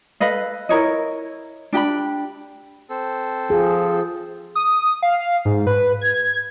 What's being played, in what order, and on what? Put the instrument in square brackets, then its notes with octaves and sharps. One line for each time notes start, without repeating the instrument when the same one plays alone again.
[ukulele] A4 B4 D#5 F5
E4 A#4 C#5 D#5
D4 G4 G5 B5
[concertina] C4 A4
[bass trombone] F3 [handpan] G#4
[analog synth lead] D#6
F5
G#2
B4
G#6